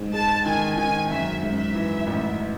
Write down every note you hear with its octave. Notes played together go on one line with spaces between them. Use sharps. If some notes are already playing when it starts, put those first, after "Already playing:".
Already playing: G#2
G#3 A5
D#3 G#5
D#3 G#5
F#2 E5
G#2 E5
E3
A1